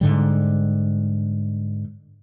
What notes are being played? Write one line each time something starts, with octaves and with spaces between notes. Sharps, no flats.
G#2 D3 G3